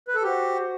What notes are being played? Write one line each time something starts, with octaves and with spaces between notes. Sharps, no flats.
B4
A4
F#4 G4 C5 F#5